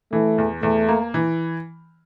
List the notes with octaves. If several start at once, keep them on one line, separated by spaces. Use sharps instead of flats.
E3 A3
E2
E2 A3
A#3
E3